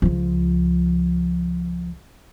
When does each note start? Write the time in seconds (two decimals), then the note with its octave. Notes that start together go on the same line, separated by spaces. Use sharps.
0.02 C#2 F3